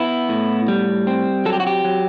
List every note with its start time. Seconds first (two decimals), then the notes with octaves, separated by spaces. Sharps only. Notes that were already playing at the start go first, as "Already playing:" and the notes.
Already playing: B3 E4
0.29 A2
0.68 G3
1.07 C4
1.45 F#3 A4
1.53 G4
1.60 F#4
1.67 G4
1.84 F#3